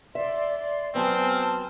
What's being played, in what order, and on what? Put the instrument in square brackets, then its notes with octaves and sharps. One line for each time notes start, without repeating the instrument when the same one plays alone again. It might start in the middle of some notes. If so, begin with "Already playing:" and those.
[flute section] D5 C6 [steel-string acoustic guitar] E5
[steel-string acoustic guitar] F#3 B3 [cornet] C4 [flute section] G#5 A5 F6